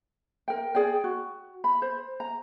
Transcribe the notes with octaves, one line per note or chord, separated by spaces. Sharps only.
A#4 G5
G#4 D5 G5
F#4
B5
C5
A#5